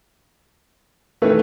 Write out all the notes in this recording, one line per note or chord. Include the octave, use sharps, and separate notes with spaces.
D#3 E3 A3 C#4 A4 B4